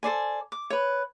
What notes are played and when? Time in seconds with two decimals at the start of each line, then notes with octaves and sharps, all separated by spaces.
0.03 A4 C5 D5 G#5
0.52 D6
0.70 B4 C#5